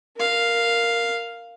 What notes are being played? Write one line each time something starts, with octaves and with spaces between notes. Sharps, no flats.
A#4 F5